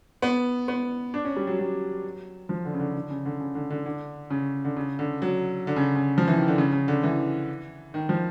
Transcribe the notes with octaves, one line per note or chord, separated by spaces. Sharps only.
B3
B3
D4
C#4
G3
F#3
F#3
F3
D3
C#3
D3
D3
C#3
D3
C#3
D3
D3
D3
C#3
D3
C#3
D3
F#3
D3
C#3
C#3
F3
E3
D#3
D3
C#3
C#3
D3
E3
D#3
F3